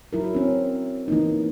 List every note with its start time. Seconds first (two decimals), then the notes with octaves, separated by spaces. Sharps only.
0.13 F#3 E4 A#4
0.34 C4 C#4
1.08 E3 A#3 D#4